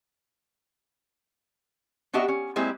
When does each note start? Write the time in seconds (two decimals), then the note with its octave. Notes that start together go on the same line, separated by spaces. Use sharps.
2.13 B3 D4 F#4 G4 D#5 E5
2.28 C#4
2.56 G#3 A#3 C4 E4 G4 G#4